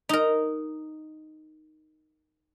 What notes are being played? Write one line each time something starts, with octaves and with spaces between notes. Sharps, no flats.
D#4 A#4